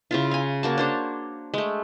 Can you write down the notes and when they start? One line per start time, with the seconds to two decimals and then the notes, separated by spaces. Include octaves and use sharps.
0.11 C#3 E4 F4
0.31 F5 G#5
0.63 A#3 F#4 A5
0.78 D4 C5 C#5
1.54 G#3 A3